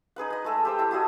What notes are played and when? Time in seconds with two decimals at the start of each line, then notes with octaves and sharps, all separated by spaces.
0.16 D#4 G#4 B4 F#5
0.30 B4 D#5
0.44 G#3 A3 A4 E5
0.65 G4 C5 G5
0.79 E4 A4
0.91 E4 F#4 G#4 D#5